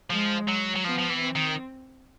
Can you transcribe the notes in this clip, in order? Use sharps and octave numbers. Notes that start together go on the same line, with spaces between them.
F3 G#3
F#3
F#3
F3 B3
F3
E3
C4
D#3